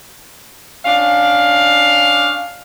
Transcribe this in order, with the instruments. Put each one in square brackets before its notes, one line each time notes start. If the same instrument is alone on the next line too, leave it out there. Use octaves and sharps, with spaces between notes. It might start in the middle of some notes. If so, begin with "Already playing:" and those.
[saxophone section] C#4 D4 F5